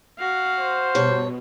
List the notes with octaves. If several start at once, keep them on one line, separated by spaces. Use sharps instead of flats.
F#4 F5
C5
G2 B2 C#5